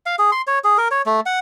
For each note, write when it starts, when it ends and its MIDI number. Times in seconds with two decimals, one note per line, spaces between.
0.06 0.16 77
0.19 0.31 68
0.32 0.42 84
0.47 0.59 73
0.64 0.77 68
0.78 0.88 70
0.91 1.02 73
1.06 1.20 57
1.26 1.39 78